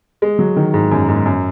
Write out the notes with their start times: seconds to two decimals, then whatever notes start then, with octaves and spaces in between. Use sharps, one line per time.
0.22 G#3
0.39 F#3
0.57 D#3
0.74 G#2
0.91 F#2
1.09 G#2
1.26 F#2